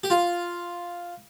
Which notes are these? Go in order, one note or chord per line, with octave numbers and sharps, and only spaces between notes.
G4
F4